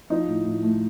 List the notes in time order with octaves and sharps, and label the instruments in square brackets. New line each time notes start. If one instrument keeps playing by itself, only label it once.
[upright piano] F3 D#4
A2
A2
A3